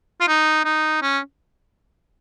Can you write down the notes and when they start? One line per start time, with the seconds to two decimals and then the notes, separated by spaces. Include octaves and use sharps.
0.21 F4
0.28 D#4
0.65 D#4
1.02 C#4